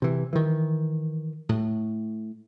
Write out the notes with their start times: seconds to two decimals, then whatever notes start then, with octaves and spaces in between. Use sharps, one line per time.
0.02 C3 E3
0.33 D#3 E3
1.49 A2